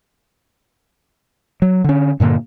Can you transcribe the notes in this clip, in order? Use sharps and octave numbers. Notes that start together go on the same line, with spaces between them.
F#3
D3 C#4
G2 A#2 D3 A#3